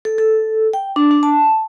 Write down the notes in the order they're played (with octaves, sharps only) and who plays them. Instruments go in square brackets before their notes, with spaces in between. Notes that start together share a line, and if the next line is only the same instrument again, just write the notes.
[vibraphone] A4
A4
G5
D4
D4
A5